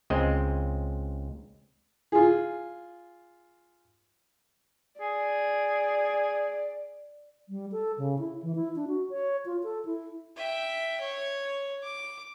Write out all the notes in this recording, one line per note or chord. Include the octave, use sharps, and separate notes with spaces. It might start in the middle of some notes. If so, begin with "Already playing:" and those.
C#2 G#3 C4 D#5
F4 G#4
G#4 D5
G3
A4
C#3
E4
E3
E4
D4
F#4
C#5
F4
A4
E4
E5 G5
C#5
D6